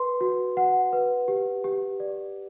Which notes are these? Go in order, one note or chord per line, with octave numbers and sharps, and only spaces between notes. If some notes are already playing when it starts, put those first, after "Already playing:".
Already playing: B4 C6
F#4
F#5
B4
G4
G4
D5